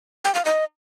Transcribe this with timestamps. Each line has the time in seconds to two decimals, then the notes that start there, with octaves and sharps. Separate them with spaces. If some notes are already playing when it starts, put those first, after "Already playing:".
0.25 G5
0.35 F5
0.45 D#5